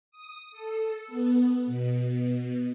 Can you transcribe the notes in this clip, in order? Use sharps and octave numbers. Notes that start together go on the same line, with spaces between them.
D#6
A4
B3
B2